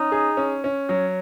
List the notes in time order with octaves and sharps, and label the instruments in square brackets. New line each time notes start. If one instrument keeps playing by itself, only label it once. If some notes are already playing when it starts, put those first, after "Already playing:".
Already playing: [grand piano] C#4 [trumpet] D#4
[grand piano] G#4
C#4
C#4
F#3